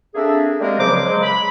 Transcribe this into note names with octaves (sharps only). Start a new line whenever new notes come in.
A#3 C4 D4 G#4 A4 E5
G3 G#3 A#3 C4 A#4
C#2 C#3 F3 F#3 C5 D6
C#3 F#3 G#3
B5